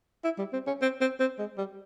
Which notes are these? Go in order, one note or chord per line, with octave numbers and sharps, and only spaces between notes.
E4
G3
C4
C#4
C4
C4
C4
G#3
G3